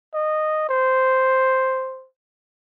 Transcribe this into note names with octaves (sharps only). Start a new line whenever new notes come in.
D#5
C5